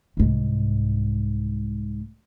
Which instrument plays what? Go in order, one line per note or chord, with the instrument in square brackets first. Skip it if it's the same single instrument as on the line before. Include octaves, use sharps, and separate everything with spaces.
[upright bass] C2 G#2